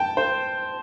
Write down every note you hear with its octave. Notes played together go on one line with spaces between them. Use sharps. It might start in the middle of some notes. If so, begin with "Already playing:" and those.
Already playing: G5 A5
C5